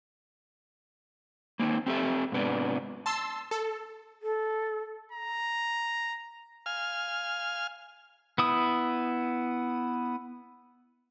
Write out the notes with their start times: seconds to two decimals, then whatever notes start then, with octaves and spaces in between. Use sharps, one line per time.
1.59 A#3 C4 D#4
1.86 C4 G4 A4 E5
2.32 G#2 C3 B3 D4
3.06 A5 C6 E6
3.51 A4
4.23 A4
5.12 A#5
6.66 F5 G#5 F6
8.38 B3 E4 D#6